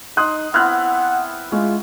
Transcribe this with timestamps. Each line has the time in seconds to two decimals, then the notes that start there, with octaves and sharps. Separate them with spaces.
0.17 D#4 C6 D#6 F#6
0.54 B3 C4 E4 F#5 F6 F#6
1.52 G#3 C#4 F4